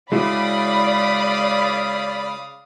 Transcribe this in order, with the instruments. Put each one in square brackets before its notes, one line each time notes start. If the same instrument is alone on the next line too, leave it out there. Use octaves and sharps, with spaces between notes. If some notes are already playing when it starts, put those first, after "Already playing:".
[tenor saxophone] C#3 [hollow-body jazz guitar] G#3 E4 F#4 [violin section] D5 B5 [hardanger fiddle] F5 D#6